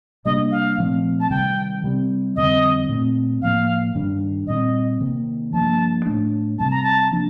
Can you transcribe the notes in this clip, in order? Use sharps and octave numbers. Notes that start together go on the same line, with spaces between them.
C3 G3 A#3 D4 D#5
F5
A#2 F3 A3 C4
A5
C3 D#3 G3 G5
C3 G3 C4
F2 D3 G3 C4 D#5
A#2 A3 C4
A2 F3 A#3 F5
G2 D#3 G3 D4
A#2 G3 C4 D#5
C3 D#3 A#3
G2 F3 A#3 A5
A2 A3 D4
C3 G3 C4 A5
A#5
A5
F3 A#3 D4